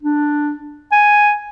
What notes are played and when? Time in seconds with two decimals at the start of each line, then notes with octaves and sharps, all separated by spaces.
0.03 D4
0.92 G#5